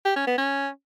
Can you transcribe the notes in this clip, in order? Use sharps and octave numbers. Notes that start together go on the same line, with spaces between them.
G4
C#4
B3
C#4